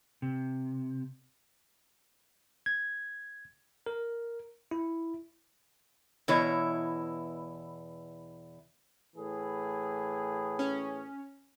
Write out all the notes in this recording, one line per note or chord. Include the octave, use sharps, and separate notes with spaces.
C3
G#6
A#4
E4
E2 B2 E4 C#5
A2 E3 G#4
C#4